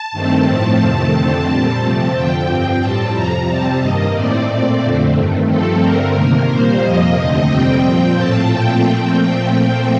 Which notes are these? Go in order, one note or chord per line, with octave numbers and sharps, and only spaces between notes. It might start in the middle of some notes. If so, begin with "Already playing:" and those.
Already playing: A5
G2 D#3 A3 C4
A2 F3 A3 C4 A5
F2 C3 D#3 A3
F2 D3 A3 C4
A#2 G3 C4
C3 F3 A3 C4 A5
F2 D3 F3 G5
G2 F3 C4
A2 G3 C4 A5
F2 C3 F3 A#5
C3 G3 C4 A5
G2 D#3 A#3 D#5
A2 A3 C4 D5
A#2 A3 C4
F2 D3 A3 C4
G2 D#3 A3
G2 F3 A3 C4 A4
G2 D3 A3 C4 A#4
C3 D#3 A#3
A#2 G3 A#3 C5
F2 C3 F3 A#3 D#5
D#2 D3 A3 C4
F2 C3 G3 C4 G5
A#2 F3 C4
A2 F3 A3 C4 A5
A#2 F3 A3 C4 G5